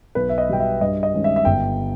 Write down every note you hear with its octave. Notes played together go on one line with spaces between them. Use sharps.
B1 B4
E5
D#5
B2 G3 G5
E5
G2 D#5
D#5
D#3 G#3 C#4
E5
E5
G1 G5